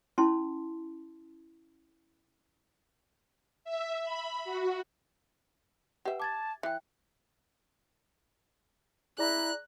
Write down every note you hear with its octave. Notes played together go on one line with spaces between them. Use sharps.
C#4 E4 A5 C6
E5
B5
F#4
G4 B4 E5 F#5
A5 D6 G#6 A6
E3 E5 G5 F#6
E4 G#4 D5 A#5 F#6